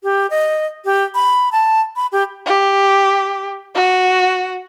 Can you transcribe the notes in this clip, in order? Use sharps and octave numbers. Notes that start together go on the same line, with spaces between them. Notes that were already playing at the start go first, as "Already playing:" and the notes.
G4
D#5
G4
B5
A5
B5
G4
G4
F#4